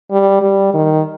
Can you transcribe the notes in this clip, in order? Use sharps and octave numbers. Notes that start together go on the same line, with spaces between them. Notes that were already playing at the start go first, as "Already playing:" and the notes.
G3
G3
D#3